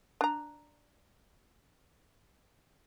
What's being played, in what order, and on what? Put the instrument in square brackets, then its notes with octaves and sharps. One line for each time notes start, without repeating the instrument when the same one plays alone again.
[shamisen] D4 A#5